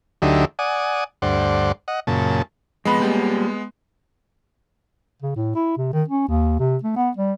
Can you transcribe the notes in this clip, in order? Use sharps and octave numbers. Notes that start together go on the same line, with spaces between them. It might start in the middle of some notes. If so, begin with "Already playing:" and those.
D2 D3 F#3 D#4 G4 E5
D5 F#5 G#5 D#6
D2 G2 C5 D5 F#5
D#5 F#5
F#2 A#2 C#3 A5
F2 G#3 B3 B5
G3 A#3 G4
C#3
A2
E4
C3
D#3
C#4
D#2
C3
A3
B3
G3